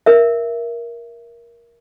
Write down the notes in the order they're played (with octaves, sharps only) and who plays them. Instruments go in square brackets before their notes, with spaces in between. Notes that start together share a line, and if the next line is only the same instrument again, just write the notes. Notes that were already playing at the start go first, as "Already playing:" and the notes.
[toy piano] A#4 E5